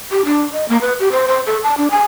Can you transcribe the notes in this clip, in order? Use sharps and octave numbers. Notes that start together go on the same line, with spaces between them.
G4
D4
D#5
A#3
B4
G4
C5
C5
A4
A5
D4
G#5